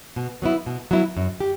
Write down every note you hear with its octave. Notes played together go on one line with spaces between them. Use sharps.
B2
F#3 B3 E4
B2
F#3 B3 E4
F#2
G4